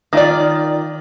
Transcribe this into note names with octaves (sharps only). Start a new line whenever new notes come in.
D#3 F4 D5